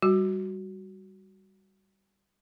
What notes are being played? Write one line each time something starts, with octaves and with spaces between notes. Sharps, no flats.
G3 F#4